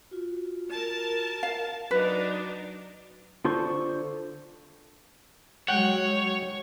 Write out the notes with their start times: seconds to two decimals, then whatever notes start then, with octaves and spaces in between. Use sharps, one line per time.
0.11 F4 F#4
0.70 A#4 A5
1.43 F5
1.91 F#3 D4 D#4 F#4 B4
3.45 D3 F4 A4 C5 C#6
5.68 F#3 G#3 C#5 F#5 G5